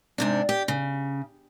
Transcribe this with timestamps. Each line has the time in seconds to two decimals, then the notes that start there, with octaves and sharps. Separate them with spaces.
0.18 G#2 C3 D4
0.49 G4
0.68 C#3